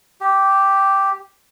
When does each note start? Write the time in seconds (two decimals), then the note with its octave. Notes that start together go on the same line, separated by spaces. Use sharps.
0.21 G4